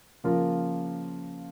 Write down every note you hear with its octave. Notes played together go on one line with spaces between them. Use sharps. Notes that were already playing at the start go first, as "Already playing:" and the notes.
C#3 F3 A#3 F4 A#4